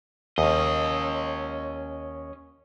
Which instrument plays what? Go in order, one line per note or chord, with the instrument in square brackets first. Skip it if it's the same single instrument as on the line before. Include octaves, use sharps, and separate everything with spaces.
[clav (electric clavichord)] D#2 [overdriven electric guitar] C#4 D#5